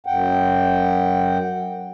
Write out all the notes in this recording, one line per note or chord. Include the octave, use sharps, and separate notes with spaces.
F#2 F#5 G5